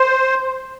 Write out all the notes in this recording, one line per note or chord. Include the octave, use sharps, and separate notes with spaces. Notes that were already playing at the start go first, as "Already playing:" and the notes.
Already playing: C5